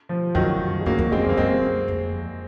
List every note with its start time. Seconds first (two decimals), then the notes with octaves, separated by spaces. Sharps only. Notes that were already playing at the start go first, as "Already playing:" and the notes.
0.09 F3
0.35 F#2 D#3 F#3
0.81 G#3
0.86 F#2 F#3 A#3
0.98 F2
1.12 F#2 G#3 C4
1.24 F2
1.29 A#3
1.37 F#2 G#3 C4
1.88 F2